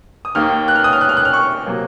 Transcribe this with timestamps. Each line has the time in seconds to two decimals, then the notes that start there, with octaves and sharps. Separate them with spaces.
0.25 D#6
0.35 D#2 D#3 A#3 F6
0.68 F#6
0.76 F6
0.84 D#6
0.93 F6
1.01 F#6
1.09 F6
1.17 F#6
1.25 F6
1.33 C#6
1.66 C3 F#3 A#3